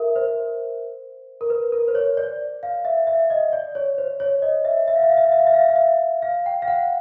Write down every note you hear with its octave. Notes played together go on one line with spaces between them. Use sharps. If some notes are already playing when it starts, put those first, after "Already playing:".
Already playing: A#4 E5
C5
A#4
B4
A#4
C5
C#5
D5
F5
E5
E5
D#5
D5
C#5
C5
C#5
D#5
E5
E5
F5
E5
F5
E5
F5
E5
F5
E5
F5
E5
F5
E5
F5
G5
F5
F#5